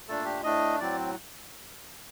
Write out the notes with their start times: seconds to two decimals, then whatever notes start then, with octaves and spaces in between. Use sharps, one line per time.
0.08 A#2 A3 D4 A4
0.25 G4
0.43 A2 A3 D4 D#5
0.80 A2 F#3 C4 D5